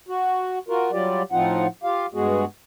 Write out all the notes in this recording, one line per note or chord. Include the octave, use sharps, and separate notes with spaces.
F#4
F4 F#4 A#4
F#3 G3 F4 G4 D5
A2 F3 C4 D#4 F4 F#5
F4 G4 F5
G2 G#3 B3 F#4 G#4